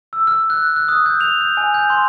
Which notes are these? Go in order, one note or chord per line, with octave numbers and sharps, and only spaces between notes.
E6
F6
F#6
F#6
D#6
G6
F7
G6
G#5
G6
C6